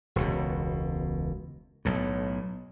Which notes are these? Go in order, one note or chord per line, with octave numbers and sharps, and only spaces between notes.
E1 C#2 B2
B1 A2